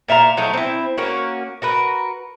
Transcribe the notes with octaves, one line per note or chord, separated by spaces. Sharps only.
A#2 E5 F5 A#5
F#3 A3 D#4
C4 E4
A#3 C#4 F#4
F#4 A#4 B4